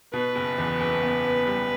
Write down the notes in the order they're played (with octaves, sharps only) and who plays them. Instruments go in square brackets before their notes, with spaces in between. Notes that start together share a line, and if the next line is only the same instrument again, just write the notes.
[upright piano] B2 [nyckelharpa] B4
[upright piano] F#1
E2
F#1
B3
B3
G3